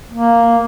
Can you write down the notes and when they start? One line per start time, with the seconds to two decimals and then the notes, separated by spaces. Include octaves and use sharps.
0.12 A#3